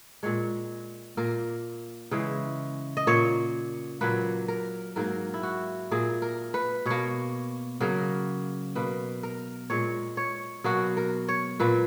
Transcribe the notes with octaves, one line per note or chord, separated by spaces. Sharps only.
A#2 G#3 C#5
A#2 A#3 A#4
C#3 E3 G#3
D#5
A#2 A#3 C#5
A#2 F#3 A#3 B4
A#4
G#2 F#3 A#3 A#4
E4
F#4
A#2 A#3 G#4
A#4
B4
B2 A#3 C#5
C#3 F#3 A#3 A#4
B2 A#3 B4
A#4
A#2 G#3 C#5
C#5
B2 F#3 A#3 F#4
A#4
C#5
A#2 A#3 B4